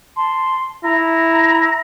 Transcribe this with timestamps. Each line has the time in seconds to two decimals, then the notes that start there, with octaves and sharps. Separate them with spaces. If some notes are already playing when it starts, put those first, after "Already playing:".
0.16 A5 C6
0.84 E4 A#5 A#6